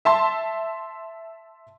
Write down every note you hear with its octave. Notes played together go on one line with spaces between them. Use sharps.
E5 A5 C6